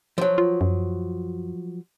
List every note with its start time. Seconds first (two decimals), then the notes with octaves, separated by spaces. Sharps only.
0.18 F3 F#3
0.38 F4
0.61 F#2